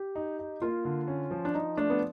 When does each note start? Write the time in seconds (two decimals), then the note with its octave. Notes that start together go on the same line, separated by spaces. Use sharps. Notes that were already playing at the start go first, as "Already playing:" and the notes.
Already playing: G4
0.15 D#4
0.39 D#4
0.62 A#3 F4
0.85 D3
1.08 C#4
1.31 F3
1.45 D4
1.54 F3 D#4
1.77 A3 D4
1.90 B3